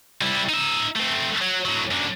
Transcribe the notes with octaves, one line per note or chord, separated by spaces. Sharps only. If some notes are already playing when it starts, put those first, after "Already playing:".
G3 E4
D#4 E5
A3 C4
F#3
A2 F#3
F#2 D3